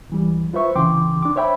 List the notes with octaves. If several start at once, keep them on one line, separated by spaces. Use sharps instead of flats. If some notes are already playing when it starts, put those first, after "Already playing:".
C#2 E3 G3
F4 B4 C5 E5 C#6
C2 C#3 E3 G5 C6 D6
D4 D6
C5 C#5 E5 G5 B5